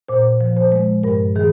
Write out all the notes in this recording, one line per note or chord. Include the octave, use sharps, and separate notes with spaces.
A#2 C5
F3
C5
G#3
G2 A#4
D#3 G#4